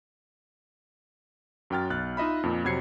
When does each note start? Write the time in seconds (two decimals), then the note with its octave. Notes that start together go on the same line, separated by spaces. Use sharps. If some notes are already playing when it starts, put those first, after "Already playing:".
1.70 F#2 F#3 G5 F6 A6
1.90 B1 F#6 A6
2.17 D#4 F4 D#5 E5 B5
2.43 F2 A#2
2.64 F2 C3 F#3 G#6 C7 C#7